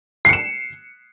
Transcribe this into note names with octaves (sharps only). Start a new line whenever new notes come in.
C7 C#7 E7